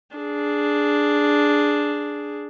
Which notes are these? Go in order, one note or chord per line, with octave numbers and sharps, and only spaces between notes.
D4 G#4